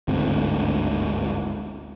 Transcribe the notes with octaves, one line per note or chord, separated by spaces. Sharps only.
G1 D2 G#2 C4